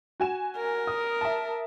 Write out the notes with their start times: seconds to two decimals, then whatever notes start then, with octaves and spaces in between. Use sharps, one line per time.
0.20 F#4 G#5 E7
0.57 A#4
0.87 D#6
1.21 E5 A5